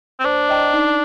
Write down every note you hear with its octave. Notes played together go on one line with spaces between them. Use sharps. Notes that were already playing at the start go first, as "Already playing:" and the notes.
C4
D4 C5
D#5 G5 A#5
D#4